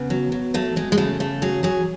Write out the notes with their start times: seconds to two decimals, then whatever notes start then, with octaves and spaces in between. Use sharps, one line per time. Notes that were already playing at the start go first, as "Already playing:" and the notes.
Already playing: C#3 B3
0.10 F#3
0.32 F#3
0.54 F#3 A3
0.76 F#3 G#3
0.92 G#3
0.98 C#3 A3
1.20 C#3 A3
1.42 F#3 G#4
1.63 F#3 G#4